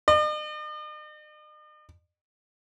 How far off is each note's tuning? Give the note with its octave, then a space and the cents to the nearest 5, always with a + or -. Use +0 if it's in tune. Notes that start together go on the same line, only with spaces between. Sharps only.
D#5 -45